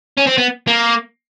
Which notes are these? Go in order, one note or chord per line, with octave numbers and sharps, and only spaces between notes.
C#4
C4
B3
A#3